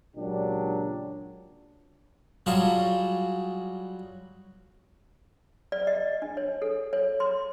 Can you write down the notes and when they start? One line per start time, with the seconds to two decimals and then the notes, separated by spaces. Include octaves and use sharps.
0.16 C#2 A#2 F#3 D4 G4
2.46 F#3 G3 F4 F#4 G#4 A5
5.72 D5
5.87 D#5
6.22 D4
6.37 C#5
6.62 A4
6.93 C#5
7.20 C6